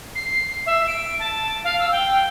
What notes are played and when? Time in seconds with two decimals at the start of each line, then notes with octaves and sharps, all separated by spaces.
0.15 C7
0.66 E5
0.87 D7
1.19 A5
1.64 F5
1.79 E6
1.91 G5